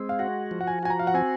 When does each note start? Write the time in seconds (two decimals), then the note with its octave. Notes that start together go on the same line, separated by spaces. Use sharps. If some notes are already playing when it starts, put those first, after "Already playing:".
Already playing: G#3 C4
0.09 F5
0.19 F#4 F#5
0.51 F3
0.61 F#5
0.67 G#5
0.83 F#4 G#5
0.90 A#5
0.99 F5
1.07 F#5
1.14 C4 G#5